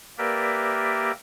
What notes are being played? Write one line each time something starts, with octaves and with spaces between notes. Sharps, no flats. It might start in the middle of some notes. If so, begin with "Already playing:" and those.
A#3 G4 A#4 B4 D5 E5